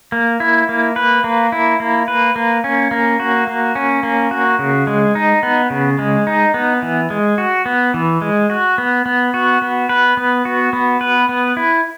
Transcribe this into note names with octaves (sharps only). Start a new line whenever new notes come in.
A#3
E4
A#3
B4
A#3
E4
A#3
B4
A#3
C#4
A#3
F#4
A#3
C#4
A#3
F#4
C#3
G#3
D#4
B3
C#3
G#3
D#4
B3
E3
G#3
F#4
B3
E3
G#3
F#4
B3
B3
F#4
B3
B4
B3
F#4
B3
B4
B3
E4